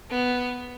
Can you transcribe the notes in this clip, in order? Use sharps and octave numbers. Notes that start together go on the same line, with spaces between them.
B3